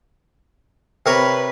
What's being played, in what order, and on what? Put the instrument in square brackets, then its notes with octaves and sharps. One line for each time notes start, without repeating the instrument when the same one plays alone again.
[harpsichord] C3 A#4 C#5 [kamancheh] B4